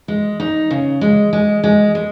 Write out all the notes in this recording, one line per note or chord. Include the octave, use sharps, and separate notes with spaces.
G#3
D#4
C#3
G#3
G#3
G#3
G#3